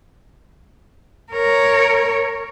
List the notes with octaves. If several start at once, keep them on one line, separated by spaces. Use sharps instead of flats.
A#4 C#5